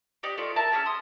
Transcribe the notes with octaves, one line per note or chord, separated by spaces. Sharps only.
D4 D#4 G4 D5
A3 F4 D5
A#4 E5 A5
C#4 G4 G#4 E5
C6 D#6